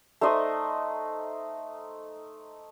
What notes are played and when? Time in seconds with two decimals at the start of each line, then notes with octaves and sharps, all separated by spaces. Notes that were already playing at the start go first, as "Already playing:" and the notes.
0.21 A3 D#4 C5 D#5